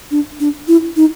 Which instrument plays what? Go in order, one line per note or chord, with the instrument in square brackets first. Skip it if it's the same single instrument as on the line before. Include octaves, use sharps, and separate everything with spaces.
[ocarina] D4
D4
E4
D#4